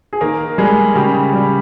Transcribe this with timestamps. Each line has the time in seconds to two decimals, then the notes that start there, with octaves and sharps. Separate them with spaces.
0.13 G#4
0.21 D#3 A#3 A#4
0.58 G3 G#3 G#4
0.95 C#3 G4
1.33 G3